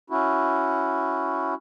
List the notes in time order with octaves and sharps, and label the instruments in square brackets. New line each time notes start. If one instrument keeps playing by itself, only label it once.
[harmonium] C#4 E4 F#4